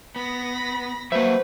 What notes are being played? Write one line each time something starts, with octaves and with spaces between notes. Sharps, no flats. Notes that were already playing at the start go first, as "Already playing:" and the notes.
B3 B5 A#6
F#3 A#3 F#4 B4 C5 E5